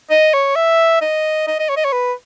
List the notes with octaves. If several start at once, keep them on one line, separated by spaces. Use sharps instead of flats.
D#5
C#5
E5
D#5
D#5
D#5
C#5
D#5
C#5
B4